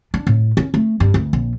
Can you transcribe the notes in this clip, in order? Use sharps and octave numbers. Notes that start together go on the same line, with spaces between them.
D4
A2
C#4
A3
G2
D2
A#1